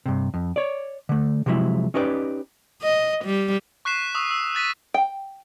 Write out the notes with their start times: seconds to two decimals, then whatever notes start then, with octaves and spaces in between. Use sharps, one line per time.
0.06 G2 C3
0.34 F2
0.56 C#5 D5
1.09 D3 A3
1.46 C3 F3 F#3 G#3 E4
1.94 C#4 D#4 G4 B4 C5 D5
2.82 D#5
3.25 G3
3.85 C#6 F#6 B6 C7 E7
4.15 C#6 D#6 E6
4.31 E6
4.55 F#6 A6 B6 D#7
4.94 G5